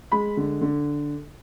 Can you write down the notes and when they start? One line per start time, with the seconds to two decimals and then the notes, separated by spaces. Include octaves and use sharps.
0.12 G#3 B5
0.37 D3
0.61 D3